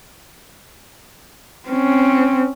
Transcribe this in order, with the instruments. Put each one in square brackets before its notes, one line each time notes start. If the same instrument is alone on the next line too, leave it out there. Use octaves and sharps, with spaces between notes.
[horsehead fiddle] C4 C#4